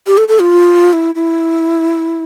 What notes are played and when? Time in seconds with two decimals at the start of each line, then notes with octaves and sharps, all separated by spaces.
0.07 G4
0.18 A4
0.28 A4
0.40 F4
0.93 E4
1.15 E4